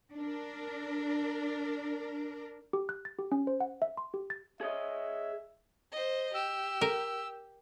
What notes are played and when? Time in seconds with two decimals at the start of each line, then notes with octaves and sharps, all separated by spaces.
0.14 D4 A#4
2.73 G4
2.89 F#6
3.05 A6
3.19 G4
3.32 C#4
3.47 C5
3.60 F#5
3.82 E5
3.97 C6
4.14 G4
4.30 A6
4.61 G#4 C#5 D#5 E5
5.92 C5 D#5
6.34 G4 E6
6.81 A#4